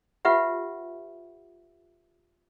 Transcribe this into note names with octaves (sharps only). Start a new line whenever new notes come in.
F4 G4 B4 E5 F#5